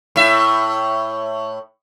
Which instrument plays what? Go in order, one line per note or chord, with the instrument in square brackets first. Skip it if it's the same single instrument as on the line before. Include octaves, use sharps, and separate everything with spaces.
[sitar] A2 E5